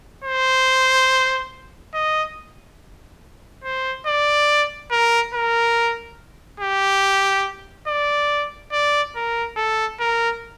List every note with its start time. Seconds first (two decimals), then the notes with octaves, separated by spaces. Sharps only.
0.24 C5
1.94 D#5
3.64 C5
4.06 D5
4.91 A#4
5.34 A#4
6.60 G4
7.88 D5
8.72 D5
9.15 A#4
9.57 A4
10.00 A#4